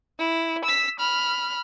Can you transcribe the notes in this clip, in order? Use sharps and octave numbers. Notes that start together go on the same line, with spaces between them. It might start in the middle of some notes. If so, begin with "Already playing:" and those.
E4
E6 B6
B5 F6